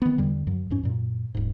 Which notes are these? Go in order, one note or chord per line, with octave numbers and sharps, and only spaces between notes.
D#3 B3
E2 D3 G3
F#2 F#3
F2 G#2 C#4
F#2 A#2
D#1 G#2